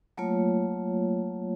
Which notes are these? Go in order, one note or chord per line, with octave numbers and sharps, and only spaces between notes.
F#3 A3 A#3 F4 C#5